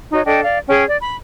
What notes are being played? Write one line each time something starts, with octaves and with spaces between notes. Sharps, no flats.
D#4 F#4 C#5 D#5
D4 A4 D#5 G5
D5 F5
C#4 G#4 G5
D5
B5